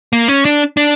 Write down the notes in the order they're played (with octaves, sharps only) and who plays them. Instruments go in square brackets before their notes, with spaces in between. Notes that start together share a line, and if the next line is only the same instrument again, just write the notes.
[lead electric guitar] A#3
C#4
D4
D4